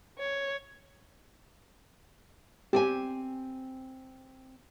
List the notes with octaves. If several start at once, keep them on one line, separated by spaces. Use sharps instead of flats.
C#5
C4 G4 G5 G#5